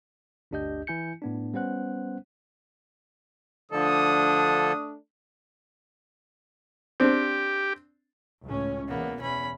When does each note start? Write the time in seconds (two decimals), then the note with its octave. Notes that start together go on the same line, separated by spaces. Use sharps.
0.51 G1 D2 D4 G4 D#5 G6
0.87 E3 E4 G#5 G6 C#7
1.22 A2 B3 D4
1.54 G3 B3 C#4 C5 F#5 F#6
3.71 D3 F3 A3 D4 A4 D#6
7.00 C4 D4 G4
8.45 C#2 A2 C#4
8.88 E2 B2 A#3 B3
9.21 E2 C#4 B5